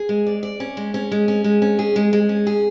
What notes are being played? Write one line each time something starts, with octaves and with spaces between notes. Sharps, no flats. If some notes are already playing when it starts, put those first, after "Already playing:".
Already playing: G#4
G#3
D5
D5
C#4
G#3
C#4
G#3
C#4
G#3
C#4
G#4
G#3
G#3
C#4
G#4